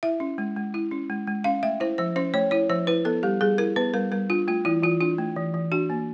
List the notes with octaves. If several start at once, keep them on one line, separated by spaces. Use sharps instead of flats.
E4 E5
C#4
G#3
G#3
E4
C#4
G#3
G#3
C#4 F5
A3 E5
E4 C5
F3 C5
C#4 C5
A3 C#5
E4 C#5
F3 C5
E4 B4
B3 A4
G3 G4
G3 G#4
E4 A#4
B3 B4
G3 A#4
G3 A#4
D4 F4
A3 F4
E3 E4
E3 F4
D4 F4
A3
E3
E3
D4 F#4
A#3